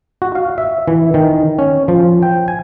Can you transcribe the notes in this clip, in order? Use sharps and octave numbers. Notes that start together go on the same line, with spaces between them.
F#4
F5
E5
E3
D#3
C#4
F3
G5
G#5